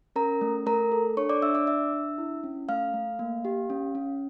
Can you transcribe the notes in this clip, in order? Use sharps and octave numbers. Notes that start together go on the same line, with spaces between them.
C#4 A#4 A#5
A3
A3 A#4 A#5
A4
D4 C#5 C#6
D5 D6
D4 E5 E6
D5 D6
D4 E5 E6
D4
E4
C#4
A3 F5 F6
A3
A#3
G4
C#4
C#4